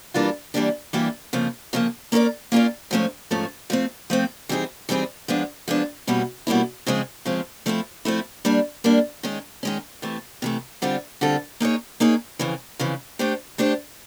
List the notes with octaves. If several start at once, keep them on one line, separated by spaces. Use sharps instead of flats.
E3 G3 A#3 D4 F4
E3 G3 A#3 D4 G4
E3 G3 A#3 D4 G4
F2 C#3 F3 A#3
F2 C#3 F3 A#3
A#3 C#4 F4 A#4 D5
A#3 C#4 F4 A#4 D5
G#2 F3 A3 C#4
G#2 F3 A3 C#4
F3 A3 C4
F3 A3 C4
E3 G3 C4 D#4 G#4
E3 G3 C4 D#4 G#4
F3 G#3 B3 D4
F3 G#3 B3 D4
B2 G3 A#3 C#4 E4
B2 G3 A#3 C#4 E4
C#3 F3 G#3 C4
C#3 F3 G#3 C4
F3 A3 C4 E4
F3 A3 C4 E4
G3 A#3 D4
G3 A#3 D4
D#3 G#3 C#4
D#3 G#3 C#4
C3 E3 A3
C3 E3 A3
D3 G3 C4 F4 A4
D3 G3 C4 F4 A4
A#3 D#4 G#4 C#5
A#3 D#4 G#4 C#5
F2 C#3 E3
F2 C#3 E3
A3 D4 G4 C5
A3 D4 G4 C5